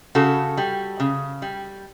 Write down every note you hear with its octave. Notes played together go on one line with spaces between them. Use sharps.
C#3 F#4 A4
G3
C#3
G3